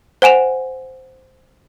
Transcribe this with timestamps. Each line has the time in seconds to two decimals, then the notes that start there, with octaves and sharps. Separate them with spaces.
0.22 C5 F#5 G#5 E7 F7